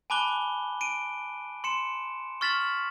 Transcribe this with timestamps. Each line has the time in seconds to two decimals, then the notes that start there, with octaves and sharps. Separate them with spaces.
0.10 G#5 A5 B5 D6 F#6 G7
0.81 D7 D#7
1.64 C6 C#7 E7
2.41 C#6 F6 A6 B6 E7 F#7